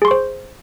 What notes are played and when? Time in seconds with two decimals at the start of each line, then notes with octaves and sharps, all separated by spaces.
0.02 G#4
0.05 C6
0.08 C#6
0.11 C5